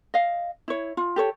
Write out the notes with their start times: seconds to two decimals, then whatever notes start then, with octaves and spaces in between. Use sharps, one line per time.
0.14 D#5 F5
0.68 E4 C#5
0.97 F4
1.16 G4 A4 C#5